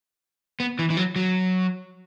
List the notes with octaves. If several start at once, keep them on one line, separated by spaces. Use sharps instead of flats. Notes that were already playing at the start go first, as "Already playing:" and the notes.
B3
E3
E3
F#3
F#3